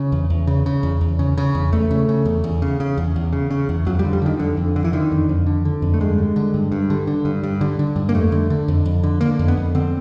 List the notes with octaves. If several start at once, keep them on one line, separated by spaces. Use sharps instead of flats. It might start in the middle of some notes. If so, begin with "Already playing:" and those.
Already playing: C#3
E2
E2
C#3
C#3
E2
E2
C#3
C#3
E2
E2 A3
C#3
C#3
E2
E2
C#3
C#3
E2
E2
C#3
C#3
E2
F2 F#3
G3
D3
G3
D3 D#3
F2 D3
F2
D3
E3
D3 D#3
F2
F2
D3
D3
F2
A3
G2 G#3
D3
D3
G2
G2
D3
D3
G2
G2
D3
D3
G2
A#3
F2 A3
D3
D3
F2
F2
D3
D3 A#3
F2
B3
F2
D3 C4